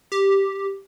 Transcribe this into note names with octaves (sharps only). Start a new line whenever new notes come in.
G4